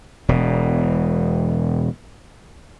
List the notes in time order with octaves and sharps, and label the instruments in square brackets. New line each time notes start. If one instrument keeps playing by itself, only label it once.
[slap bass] E1 B2